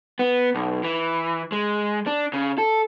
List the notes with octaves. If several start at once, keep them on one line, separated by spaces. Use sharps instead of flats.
B3
B1
E3
G#3
D4
C#3
A4